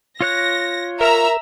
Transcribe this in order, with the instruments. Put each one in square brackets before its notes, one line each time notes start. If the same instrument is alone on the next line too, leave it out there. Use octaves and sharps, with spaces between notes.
[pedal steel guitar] F4 C#5 F#6 [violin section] A#6
[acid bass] A#4 [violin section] E5 A#5 E6